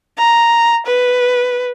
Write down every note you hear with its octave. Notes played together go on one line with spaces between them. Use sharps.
A#5
B4